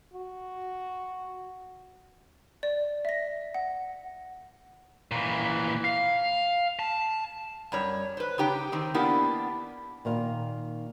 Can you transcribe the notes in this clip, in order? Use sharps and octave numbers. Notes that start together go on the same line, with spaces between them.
F#4
D5
E5 A#6
F#5
A#2 E3
F5
A5
F#2 G3 C#5
B4 C5
C#3 D#4 G4 G5
D#3 C4 D#4
A#3 B3 D4 E4 G4
A#2 D#3 F5